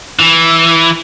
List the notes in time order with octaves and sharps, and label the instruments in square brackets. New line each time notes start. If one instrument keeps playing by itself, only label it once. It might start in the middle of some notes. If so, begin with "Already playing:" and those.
[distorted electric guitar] E3